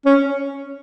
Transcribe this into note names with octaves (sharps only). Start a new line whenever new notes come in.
C#4